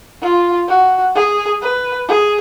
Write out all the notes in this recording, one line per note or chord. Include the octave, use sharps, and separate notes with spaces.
F4
F#4
G#4
B4
G#4